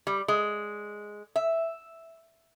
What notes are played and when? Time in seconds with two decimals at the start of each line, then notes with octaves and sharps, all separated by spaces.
0.07 G3
0.28 G#3
1.36 E5